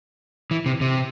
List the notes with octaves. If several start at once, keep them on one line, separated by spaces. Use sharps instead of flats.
E3
C3
C3